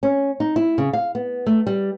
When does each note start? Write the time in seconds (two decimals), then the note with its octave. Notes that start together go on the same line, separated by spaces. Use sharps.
0.03 C#4
0.40 D#4
0.56 E4
0.78 C#3
0.93 F5
1.15 B3
1.46 A3
1.67 G3